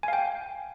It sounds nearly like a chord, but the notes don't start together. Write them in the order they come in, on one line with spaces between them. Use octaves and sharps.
G#5 F5 G5